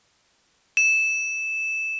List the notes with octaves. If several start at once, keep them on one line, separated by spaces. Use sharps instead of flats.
E7